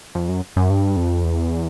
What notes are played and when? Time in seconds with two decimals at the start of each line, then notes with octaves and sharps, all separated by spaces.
0.15 F2
0.29 F#2
0.56 F#2
0.70 G2
0.97 F2
1.24 E2